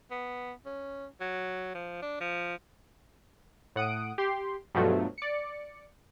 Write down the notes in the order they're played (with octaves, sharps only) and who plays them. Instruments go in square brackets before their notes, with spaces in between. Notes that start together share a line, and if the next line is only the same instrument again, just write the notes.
[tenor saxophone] B3
C#4
F#3
F3
D4
F3
[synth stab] A2 F#5 D#6 D7
G4 C6
G2 B2 F3 F#3 A3
D5 C#7